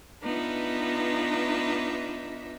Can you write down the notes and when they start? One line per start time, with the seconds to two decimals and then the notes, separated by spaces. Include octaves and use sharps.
0.23 B3 D4 D#4 F4 B4 E5